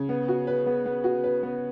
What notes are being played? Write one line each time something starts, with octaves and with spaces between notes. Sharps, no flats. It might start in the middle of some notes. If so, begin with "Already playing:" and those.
Already playing: C#3
B3
F#4
B4
B3
B3
F#4
B4
B3